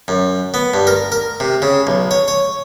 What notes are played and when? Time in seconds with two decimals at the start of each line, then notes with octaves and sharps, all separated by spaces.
0.08 F#2
0.54 B3
0.74 G2
0.87 A#4
1.12 A#4
1.40 C3
1.62 C#3
1.87 B1
2.11 C#5
2.28 C#5